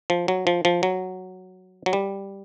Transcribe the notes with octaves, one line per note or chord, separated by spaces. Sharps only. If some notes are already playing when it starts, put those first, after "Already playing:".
F3
F#3
F3
F3
F#3
F#3
G3